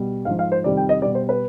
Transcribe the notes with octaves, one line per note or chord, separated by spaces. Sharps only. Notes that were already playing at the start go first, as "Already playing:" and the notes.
Already playing: B2 G3
G#2 F3 F5
F5
C5
F2 C3 D#3 G3 D5
G5
D#5
B2 G3 D5
C5
B4